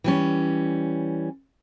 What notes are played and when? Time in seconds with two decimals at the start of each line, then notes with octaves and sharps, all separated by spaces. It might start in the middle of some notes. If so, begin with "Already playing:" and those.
0.04 E3 G3 C#4